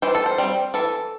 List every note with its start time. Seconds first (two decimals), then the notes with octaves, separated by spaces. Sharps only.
0.02 E3 C5
0.15 A4
0.26 C5
0.38 G3 C4
0.74 E3 A4